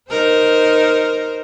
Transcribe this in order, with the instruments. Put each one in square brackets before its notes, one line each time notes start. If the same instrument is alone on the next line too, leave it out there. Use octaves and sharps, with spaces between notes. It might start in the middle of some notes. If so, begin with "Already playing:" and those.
[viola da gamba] D#4 A#4 C5